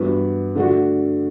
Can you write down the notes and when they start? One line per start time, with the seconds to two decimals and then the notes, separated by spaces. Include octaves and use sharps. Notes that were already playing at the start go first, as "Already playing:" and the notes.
Already playing: G2 E3 B3 F#4 B4
0.55 D3 A3 D4 F#4